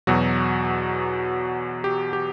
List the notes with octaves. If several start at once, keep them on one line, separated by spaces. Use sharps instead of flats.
E2 B2 F#3 F#4
G4
G4